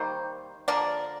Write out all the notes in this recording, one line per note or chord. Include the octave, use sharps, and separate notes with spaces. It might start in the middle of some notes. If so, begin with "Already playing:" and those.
Already playing: D#3 G3 A#3 C5
D3 F3 A#3 A#4 D5